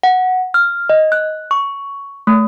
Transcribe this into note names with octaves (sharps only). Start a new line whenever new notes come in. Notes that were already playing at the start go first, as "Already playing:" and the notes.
F#5
F6
D#5
F#6
C#6
A3